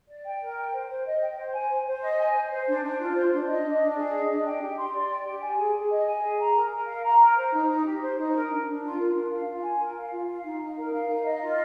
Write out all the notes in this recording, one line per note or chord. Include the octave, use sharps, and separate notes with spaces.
D5
G5
A#4
G5
C5
C5
D#5
G5
C5
G#5
C5
C5
D#5
G#5
C5
C5
D4
D4
F4
C5
D4
D#5
D4
D4
G#4
D#5
D4
G5
G4
C6
D5
G5
G4
G#5
G#4
G#4
D#5
G#5
G#4
A#5
A#4
A#4
F5
A#5
A#4
C5
D#4
D#4
G4
C5
D#4
A#4
D4
D4
F4
A#4
D4
F5
F4
G#5
A#4
F5
F4
F5
D#4
D#4
A#4
F5
D#4
D#5
F4